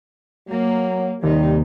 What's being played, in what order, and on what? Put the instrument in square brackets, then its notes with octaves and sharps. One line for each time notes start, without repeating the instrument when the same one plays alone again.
[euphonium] F#3 [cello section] A#3
[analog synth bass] D#2 [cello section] C3 D#4 [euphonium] G3